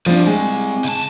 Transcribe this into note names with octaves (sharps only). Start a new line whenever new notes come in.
F3 G3 C4 D4
G#3
C#2 A5